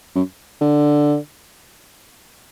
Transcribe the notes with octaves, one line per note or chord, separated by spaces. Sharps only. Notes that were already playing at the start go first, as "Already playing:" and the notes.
F#2
D3